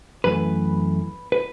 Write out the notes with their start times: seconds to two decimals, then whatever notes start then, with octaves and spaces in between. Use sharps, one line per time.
0.24 F#2 E3 A3 B4
1.32 B4